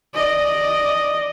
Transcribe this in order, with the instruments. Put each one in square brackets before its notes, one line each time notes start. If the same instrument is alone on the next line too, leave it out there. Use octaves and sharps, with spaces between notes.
[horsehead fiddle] D5 D#5